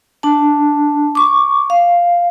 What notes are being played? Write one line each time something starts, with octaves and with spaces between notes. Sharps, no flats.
D4 A5
C#6 D6
F5